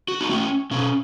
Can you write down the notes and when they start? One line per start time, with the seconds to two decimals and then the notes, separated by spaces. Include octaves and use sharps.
0.08 F#4
0.21 D#4
0.29 A3 C#4
0.71 B2 C#4